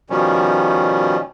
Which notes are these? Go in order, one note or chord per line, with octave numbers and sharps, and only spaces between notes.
B2 D#3 F3 G3 C#4